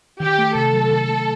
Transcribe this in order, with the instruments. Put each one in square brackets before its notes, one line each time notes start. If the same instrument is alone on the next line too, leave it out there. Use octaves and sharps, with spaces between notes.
[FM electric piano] D#3 [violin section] G4
[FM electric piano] A3
[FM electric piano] C3 [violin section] A4
[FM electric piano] F#3
D#3
A3